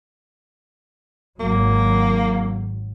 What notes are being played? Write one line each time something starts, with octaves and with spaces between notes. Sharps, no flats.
G#1 F#3 A#3